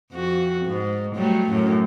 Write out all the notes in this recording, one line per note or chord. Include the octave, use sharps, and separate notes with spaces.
F2 F#4
G#2
F#3 G3 A3
F#2 A2